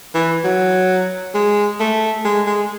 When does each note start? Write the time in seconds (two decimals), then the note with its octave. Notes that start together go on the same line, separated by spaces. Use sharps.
0.15 E3
0.44 F#3
1.35 G#3
1.80 A3
2.25 G#3
2.47 G#3